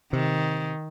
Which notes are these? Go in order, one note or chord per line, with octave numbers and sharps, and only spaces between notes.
C3 D#3